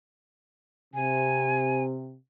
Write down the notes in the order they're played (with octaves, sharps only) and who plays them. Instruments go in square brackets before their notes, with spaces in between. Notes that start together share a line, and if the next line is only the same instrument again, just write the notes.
[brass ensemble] C3 [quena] G#5